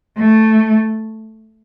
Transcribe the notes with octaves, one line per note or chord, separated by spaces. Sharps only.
A3